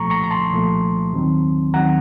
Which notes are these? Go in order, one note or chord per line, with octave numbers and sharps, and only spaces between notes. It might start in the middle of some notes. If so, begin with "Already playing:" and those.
Already playing: C2 A#2 F3 A3 A#5 C#6
A#5 C#6
A#5
A5 C6
C2 A#2 F3 A3
D#2 D#3 F#3 C4
D#2 D#3 F#3 C4 F#5 A#5